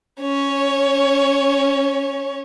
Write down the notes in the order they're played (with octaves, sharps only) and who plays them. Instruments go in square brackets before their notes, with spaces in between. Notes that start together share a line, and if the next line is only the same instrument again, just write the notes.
[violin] C#4 C#5